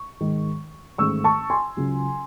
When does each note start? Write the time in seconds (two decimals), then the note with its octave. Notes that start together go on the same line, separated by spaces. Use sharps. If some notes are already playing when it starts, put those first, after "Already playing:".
Already playing: C#6
0.21 G#2 D#3 G#3
0.98 A1 G#2 D#3 A3 C#6 E6
1.24 A5 C#6
1.50 G#5 C6
1.77 C#2 C#3 F#3